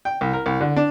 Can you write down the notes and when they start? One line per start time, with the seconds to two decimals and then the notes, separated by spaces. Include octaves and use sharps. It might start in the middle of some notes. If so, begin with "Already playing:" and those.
0.05 G5
0.21 C2
0.33 A#4
0.46 C2
0.61 D3
0.76 D4